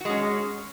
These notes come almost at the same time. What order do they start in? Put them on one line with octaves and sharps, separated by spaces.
F#4 G#3 C#4